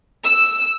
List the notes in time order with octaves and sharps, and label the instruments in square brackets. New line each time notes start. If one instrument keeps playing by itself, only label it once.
[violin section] E6